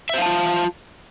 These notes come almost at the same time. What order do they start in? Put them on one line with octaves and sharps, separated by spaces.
E5 C5 F5 A5 F4